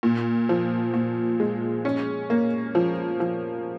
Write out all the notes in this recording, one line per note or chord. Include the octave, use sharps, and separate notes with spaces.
A#2
F3
A#2
G#3
C#4
A#3
F3
F3